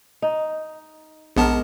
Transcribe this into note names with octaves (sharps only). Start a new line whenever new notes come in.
D#4
A#1 G#2 B3 A#4 A5